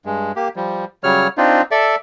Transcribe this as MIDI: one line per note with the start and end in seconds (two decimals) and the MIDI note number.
0.05 0.32 43
0.05 0.32 56
0.36 0.48 58
0.36 0.48 67
0.56 0.85 53
0.56 0.85 55
1.04 1.28 49
1.04 1.28 54
1.04 1.28 55
1.04 1.28 73
1.04 1.28 89
1.38 1.62 60
1.38 1.62 62
1.38 1.62 63
1.38 1.62 65
1.71 1.96 69
1.71 1.96 74
1.71 1.96 76